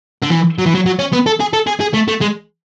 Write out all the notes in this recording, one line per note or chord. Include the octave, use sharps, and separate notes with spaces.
D3
E3
F#3
E3
F#3
F#3
C#4
B3
A4
G#4
A4
G#4
G#4
A3
A3
G#3